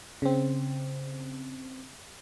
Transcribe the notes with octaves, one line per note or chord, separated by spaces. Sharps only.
C#3 C4